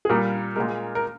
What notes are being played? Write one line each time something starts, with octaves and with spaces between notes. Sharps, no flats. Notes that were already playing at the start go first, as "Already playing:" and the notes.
G#4
A#2 G3 A#3 A#4
A#2 G#3 A#4
A#4